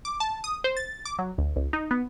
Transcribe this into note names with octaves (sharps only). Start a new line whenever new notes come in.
D6
A5
D#6
C5
A6
D6
F#3
D2
C#2
D#4
B3